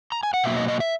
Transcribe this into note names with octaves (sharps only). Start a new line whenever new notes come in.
A#5
G#5
F#5
B2 F#3 A#3 E5
D#5
D#5
E5